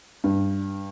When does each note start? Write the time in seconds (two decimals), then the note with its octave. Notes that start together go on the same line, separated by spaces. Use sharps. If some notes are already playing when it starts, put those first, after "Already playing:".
0.24 G2